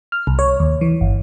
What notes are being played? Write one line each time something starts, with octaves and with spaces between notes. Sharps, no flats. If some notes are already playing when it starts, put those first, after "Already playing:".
F6
C2
C#5
D#2
E3
G1